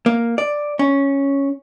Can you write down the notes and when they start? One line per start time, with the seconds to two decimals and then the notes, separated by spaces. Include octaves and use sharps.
0.06 A#3
0.38 D5
0.79 C#4